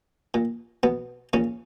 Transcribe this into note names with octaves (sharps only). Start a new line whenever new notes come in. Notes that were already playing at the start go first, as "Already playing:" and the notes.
A#2
B2 B3
A#2 C#3 C#4